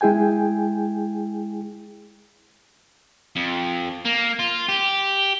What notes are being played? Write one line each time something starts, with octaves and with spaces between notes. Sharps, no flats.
G#3 E4 G#4 G5 G#5
F2
A#3
F4
G4